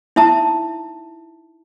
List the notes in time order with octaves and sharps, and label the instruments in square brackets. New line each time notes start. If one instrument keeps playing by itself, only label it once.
[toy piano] D#4 E4 E5 A5 A#5